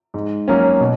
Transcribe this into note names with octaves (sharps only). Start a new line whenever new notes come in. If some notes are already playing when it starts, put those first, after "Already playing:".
G#2
F#3 A#3 C#4
B2